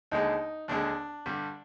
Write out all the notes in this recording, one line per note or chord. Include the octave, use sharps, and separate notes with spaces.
D#2 D3 G#3 D#4
D#2 D3 G#3 D4
G2 D3 G3